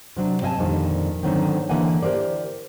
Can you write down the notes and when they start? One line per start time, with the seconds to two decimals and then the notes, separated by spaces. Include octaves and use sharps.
0.16 C3 F#3 D4
0.42 C4 D#5 E5 G#5 A5
0.59 F2 A#2 D3 D#3 G3
1.23 G#2 D3 D#3 F#3 B3 C4
1.69 D3 E3 A#3 E5 F#5 G#5
2.03 G4 A#4 C5 D5